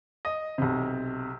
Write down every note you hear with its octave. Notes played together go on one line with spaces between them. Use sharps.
D#5
B1 C3